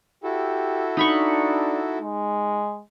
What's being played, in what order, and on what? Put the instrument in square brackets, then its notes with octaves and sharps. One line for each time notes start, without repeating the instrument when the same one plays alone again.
[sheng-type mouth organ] E4 F#4 A4 [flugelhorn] G4
[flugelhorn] D4 [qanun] D#4 B5 C#6
[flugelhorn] G#3